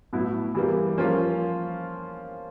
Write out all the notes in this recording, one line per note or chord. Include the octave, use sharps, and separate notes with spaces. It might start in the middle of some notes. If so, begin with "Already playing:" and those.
A2 F#3 B3 E4
E3 G3 A#3
F3 A#3 C#4 F4